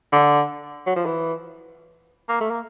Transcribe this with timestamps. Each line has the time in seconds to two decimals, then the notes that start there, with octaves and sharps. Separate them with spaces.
0.13 D3
0.86 F#3
0.96 F3
1.05 E3
2.29 A#3
2.41 A3
2.51 A#3